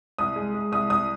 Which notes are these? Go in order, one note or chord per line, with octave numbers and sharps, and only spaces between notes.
C2 D#6
G#3
G#3
C2 D#6
C2 D#6